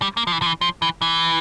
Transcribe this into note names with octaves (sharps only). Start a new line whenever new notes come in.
G3
A#3
F3
E3
F3
E3
F3
E3
E3